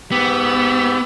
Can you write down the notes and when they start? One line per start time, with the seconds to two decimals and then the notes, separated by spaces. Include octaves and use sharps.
0.12 G#2 B3 G4 E6